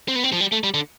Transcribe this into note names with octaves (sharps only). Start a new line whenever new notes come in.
C4
B3
C4
F3
G3
A3
G3
D3